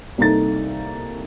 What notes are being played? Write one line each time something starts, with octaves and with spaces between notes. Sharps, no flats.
C2 A#3 D#4 A4 A6